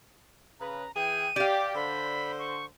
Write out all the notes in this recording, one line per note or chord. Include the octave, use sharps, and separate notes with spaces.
C#3 B4 A#5
E3 G#4 G5 D#7
G4 D5 F5
D3 C5 B5
C#6